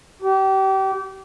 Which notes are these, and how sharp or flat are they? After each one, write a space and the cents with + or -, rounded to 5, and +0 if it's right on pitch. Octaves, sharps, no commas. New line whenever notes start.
G4 -30